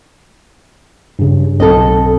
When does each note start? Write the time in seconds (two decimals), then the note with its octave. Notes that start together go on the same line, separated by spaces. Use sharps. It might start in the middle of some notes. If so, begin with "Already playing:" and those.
1.19 G2 C#3
1.60 B1 C4 A4 D#5